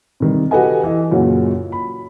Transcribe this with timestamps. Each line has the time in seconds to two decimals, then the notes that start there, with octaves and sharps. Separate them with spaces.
0.20 C3 D#3 G3
0.51 F#4 G4 A4 B4 D#5 G#5
0.84 E3 D#5
1.11 F#2 A#2 C#3 C#4 F4 F#4
1.72 B5